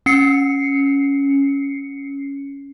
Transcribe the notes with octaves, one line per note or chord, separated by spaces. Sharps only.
C#4 C7 C#7